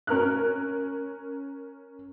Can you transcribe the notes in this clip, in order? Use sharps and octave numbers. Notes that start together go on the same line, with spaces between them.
C#4 A#4 F6 F#6